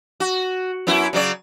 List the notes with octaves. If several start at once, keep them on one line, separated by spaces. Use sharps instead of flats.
F#4
F#2 B3 E4
C#3 F#3 D5